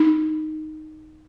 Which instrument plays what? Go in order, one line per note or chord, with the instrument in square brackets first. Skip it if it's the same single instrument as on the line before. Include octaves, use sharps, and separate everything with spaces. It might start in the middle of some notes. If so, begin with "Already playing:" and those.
Already playing: [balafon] D#4